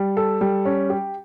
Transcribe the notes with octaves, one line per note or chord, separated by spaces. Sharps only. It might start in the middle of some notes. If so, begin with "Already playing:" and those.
Already playing: G3
A4
G3
C#4
G4